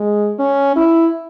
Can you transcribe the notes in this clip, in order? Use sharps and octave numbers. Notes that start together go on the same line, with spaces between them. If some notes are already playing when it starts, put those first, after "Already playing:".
Already playing: G#3
C#4
E4